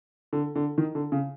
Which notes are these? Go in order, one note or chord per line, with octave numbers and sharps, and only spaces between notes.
D3
D3
D#3
D3
C#3